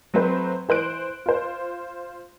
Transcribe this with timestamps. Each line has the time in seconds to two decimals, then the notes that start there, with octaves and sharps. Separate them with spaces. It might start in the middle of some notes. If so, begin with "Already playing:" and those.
0.14 F#3 A3 C4 B4 C5
0.69 E3 C5 F#6 D7
1.26 F4 C5